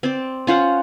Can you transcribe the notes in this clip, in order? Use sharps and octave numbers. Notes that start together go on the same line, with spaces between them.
C4 D5
C#4 F4 C5 F#5